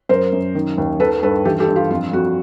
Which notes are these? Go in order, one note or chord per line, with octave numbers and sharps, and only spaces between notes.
F#2 A#4 C5
F#2
D#3
D#2
D#3 A4 B4
G2 A4 B4
E3 G4 A4
G4 A4
G2
F4 G4
F2 F4
F2 F#4